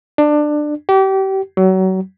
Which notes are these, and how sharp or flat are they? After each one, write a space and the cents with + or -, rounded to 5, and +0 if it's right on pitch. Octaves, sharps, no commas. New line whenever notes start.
D4 +20
G4 -30
F#3 +30